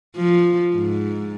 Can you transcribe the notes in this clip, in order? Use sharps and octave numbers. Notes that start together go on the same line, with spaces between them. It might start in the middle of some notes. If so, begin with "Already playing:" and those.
F3
G#2